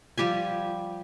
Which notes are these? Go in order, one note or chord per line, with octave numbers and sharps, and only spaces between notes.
F3 G3 G4 G#5